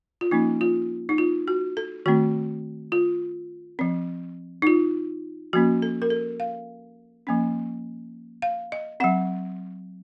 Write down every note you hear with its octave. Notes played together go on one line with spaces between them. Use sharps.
F4
F3 A#3 C#4 D#4
F4
D#4
F4
F#4
A4
D#3 A3 C4 F#4
F4
F3 C4
D#4
F4
F3 A#3 C#4 F#4
A4
A#4
A4
F5
F3 A#3 C#4
F5
D#5
F#3 C4 F#5